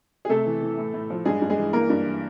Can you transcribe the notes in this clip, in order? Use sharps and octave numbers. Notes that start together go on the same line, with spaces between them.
G#4
C3 A3 A4
E3
E3
A2
A2
F3
G2 G#3 G#4
G2
G#3 G#4
E3
E3 A#3 A#4
G2
E3